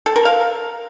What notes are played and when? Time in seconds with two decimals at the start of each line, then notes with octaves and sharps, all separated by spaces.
0.06 A4
0.16 A#4
0.25 F5